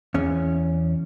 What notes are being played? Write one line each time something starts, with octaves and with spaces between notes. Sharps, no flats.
E2 C#4